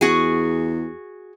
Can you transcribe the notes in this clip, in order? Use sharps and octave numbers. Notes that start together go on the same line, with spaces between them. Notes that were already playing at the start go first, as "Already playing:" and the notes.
E2 F#4 G#4